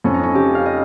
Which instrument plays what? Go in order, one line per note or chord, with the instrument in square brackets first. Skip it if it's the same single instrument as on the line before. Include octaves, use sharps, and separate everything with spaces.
[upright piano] F2 [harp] C#4
[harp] D#4
C#4
[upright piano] C#3 [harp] G4
[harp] F5
D#5